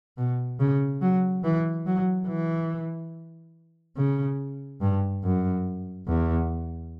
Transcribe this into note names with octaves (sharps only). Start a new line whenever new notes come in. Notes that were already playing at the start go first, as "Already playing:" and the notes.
B2
C#3
F#3
E3
F#3
E3
C#3
G2
F#2
E2